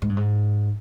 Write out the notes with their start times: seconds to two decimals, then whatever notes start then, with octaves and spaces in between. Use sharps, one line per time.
0.02 G#2
0.09 G2
0.17 G#2